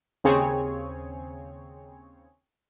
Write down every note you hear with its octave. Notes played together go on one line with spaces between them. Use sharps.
D#2 C#3 C4 G#4 C#5